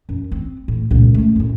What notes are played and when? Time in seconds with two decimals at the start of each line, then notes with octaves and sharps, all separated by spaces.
0.09 F#2
0.32 C4
0.68 A2
0.91 C#2 A#2
1.14 A3 C#4
1.36 F#2 A2